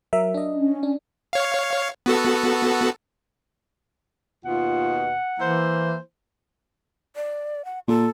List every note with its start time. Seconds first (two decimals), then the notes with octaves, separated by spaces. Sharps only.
0.13 F#3 A#4 E5
0.34 D4 D#5
0.56 C#4
0.83 D4
1.33 C#5 F5
2.06 B3 F#4 A4
4.45 D#2 B2 F4 F#5
5.39 E3 A#3 E4 C5
7.16 D5
7.65 F#5
7.88 A#2 A4